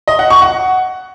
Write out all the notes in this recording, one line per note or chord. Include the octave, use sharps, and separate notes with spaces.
D#5
F#5
C#6
F#5